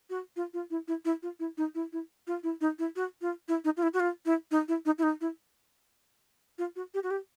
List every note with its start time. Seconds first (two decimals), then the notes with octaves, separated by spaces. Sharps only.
0.10 F#4
0.36 F4
0.54 F4
0.70 E4
0.88 E4
1.05 E4
1.22 F4
1.39 E4
1.57 D#4
1.75 E4
1.92 E4
2.27 F4
2.43 E4
2.61 D#4
2.79 E4
2.96 F#4
3.21 F4
3.48 E4
3.64 D#4
3.77 F4
3.82 E4
3.94 F#4
4.00 F4
4.25 E4
4.51 D#4
4.68 E4
4.85 D#4
4.98 E4
5.03 D#4
5.21 E4
6.58 F4
6.76 F#4
6.94 G4
7.03 F#4
7.10 G4